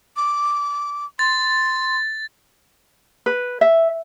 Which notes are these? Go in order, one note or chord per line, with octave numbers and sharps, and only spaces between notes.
D6
C6 A6
B4
E5